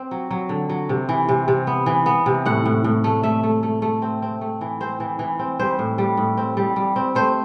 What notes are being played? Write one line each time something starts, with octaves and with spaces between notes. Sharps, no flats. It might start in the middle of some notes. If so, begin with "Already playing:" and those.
Already playing: C4
F#3
F#3
D3
F#3
C3
E3
C3
C3
B3
E3
B3
C3
A2 F#5
A2
A2
A3
A3 E5
A3
A3
A3
C4
C4
A3
E3
C4 C5
E3
E3
C4
G3 C5
A2
G3
A2
C4
G3
G3
C4
A3 C5